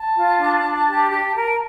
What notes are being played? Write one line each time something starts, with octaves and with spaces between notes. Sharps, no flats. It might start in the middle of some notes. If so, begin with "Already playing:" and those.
Already playing: A5
F4
D4
D4
G4
G4
A#4